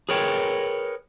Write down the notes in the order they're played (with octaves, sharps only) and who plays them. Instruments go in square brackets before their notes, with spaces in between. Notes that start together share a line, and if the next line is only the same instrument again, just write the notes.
[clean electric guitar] G#4 A#4 B4 C#5 G5